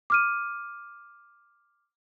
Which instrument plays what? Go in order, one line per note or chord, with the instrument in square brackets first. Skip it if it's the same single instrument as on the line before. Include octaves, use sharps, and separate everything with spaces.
[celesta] D6 F6 D#7